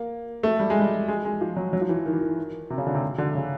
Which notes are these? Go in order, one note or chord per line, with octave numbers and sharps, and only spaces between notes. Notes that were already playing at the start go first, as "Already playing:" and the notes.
Already playing: A#3
A3
G3
G#3
G3
G#3
G#3
F3
F#3
F#3
F3
E3
D#3
E3
D#3
C3
C#3
D3
C3
D3
C#3